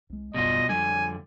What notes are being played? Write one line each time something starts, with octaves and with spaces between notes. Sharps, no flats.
C2 G#3
D1 G#1 F#2 B2 G3 F4 D#5
F2 D3 G3 G#5